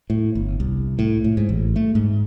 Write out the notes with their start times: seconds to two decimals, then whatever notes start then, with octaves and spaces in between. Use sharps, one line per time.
0.10 A2
0.35 G1
0.60 C2
0.99 A2
1.24 A2
1.37 G#2
1.49 A1
1.76 A3
1.95 G#2